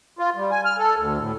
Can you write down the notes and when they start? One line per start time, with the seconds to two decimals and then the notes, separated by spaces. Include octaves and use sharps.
0.19 F4
0.36 G3
0.51 G#5
0.65 F6
0.79 A4
0.98 D2
1.19 A2